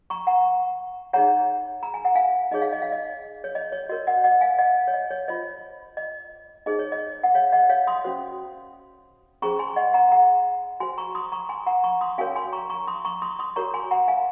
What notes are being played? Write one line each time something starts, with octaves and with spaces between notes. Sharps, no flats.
A#5 C#6
F#5 A#5
D#4 G#4 C#5 F#5 A#5
A#5
G#5
F#5
F5 G#5
D#4 G#4 C#5 D#5
F5
D#5
F5
D#5
C#5
D#5
C#5
F#4 A#4 C#5 D#5
D#5 F#5
D#5 F#5
F5 G#5
D#5 F#5
C#5
D#5
C#5
F4 C5 D#5
D#5
D#4 G#4 C5 D#5
C#5
D#5
F#5
C#5 F5
D#5 F#5
C#5 F5
C6 D#6
C#4 F#4 C5
C#4 G#4 C5 A#5 C#6
G#5 C6
D#5 F#5
F#5 A#5
F#5 A#5
F#4 C5 G#5 C6
A#5 C#6
C6 D#6
A#5 C#6
G#5 C6
F#5 A#5
A#5 C#6
C6 D#6
C#4 F#4 A#4 C#5 F5 G#5
G#5 C6
A#5 C#6
A#5 C#6
C6 D#6
A#5 C#6
C6 D#6
C6 D#6
F#4 A#4 C#5 A#5 C#6
G#5 C6
F#5 A#5
F5 G#5